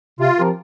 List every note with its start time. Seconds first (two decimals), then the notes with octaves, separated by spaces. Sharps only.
0.20 C3 F4
0.38 F3 C4 G4 A#4